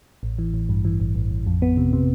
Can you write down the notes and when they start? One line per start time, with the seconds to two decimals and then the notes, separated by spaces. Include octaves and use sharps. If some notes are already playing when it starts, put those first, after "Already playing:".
0.23 A1
0.38 E3
0.54 A1
0.69 G2
0.85 E3
1.00 A1
1.15 A1
1.31 A1
1.46 F2
1.62 B3
1.77 C3
1.93 C3